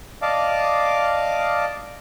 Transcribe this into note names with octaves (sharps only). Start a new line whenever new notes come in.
D5 D#5 F5 A5 D6